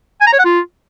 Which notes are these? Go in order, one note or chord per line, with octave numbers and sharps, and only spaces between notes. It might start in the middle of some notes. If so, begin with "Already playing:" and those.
G#5
A#5
C#5
F#5
F4